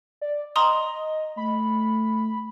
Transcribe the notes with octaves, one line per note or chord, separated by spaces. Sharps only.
D5
D#5 A#5 C6 D#6
A3 B5